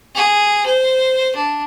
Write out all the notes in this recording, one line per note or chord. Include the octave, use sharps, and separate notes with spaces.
G#4
C5
D4